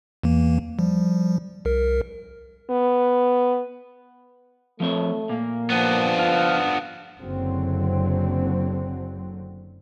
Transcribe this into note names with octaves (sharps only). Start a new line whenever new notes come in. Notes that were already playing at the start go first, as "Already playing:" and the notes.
E2 E3 A#3
F3 G3
C2 A#4
B3
F3 A3 C4 C#5
A#2 A#3
F3 B3 D4
F4 F6
F#1 D3 F#3 C4